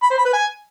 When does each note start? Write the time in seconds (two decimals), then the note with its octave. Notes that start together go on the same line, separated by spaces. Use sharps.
0.03 B5
0.10 C5
0.18 B5
0.25 B4
0.33 G#5